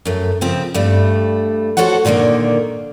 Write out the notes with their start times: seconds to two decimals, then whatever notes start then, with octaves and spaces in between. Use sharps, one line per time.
0.05 F#2 A3
0.41 C#3 F3 C4
0.74 G2 G3 A3
1.77 F#4 A4 C5 C#5 F#5
2.05 A#2 D3 D#3 A3 A#3